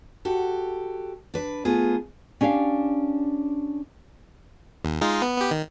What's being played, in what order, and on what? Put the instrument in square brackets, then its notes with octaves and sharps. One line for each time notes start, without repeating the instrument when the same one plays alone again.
[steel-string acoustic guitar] F#4 G4 A4
D4 B4
A3 B3 F4 G#4
[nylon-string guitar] C#4 D4 G4 C#5 F5
[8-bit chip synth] D#2
G#3 D#4 F4
B3
B3 G4
D#3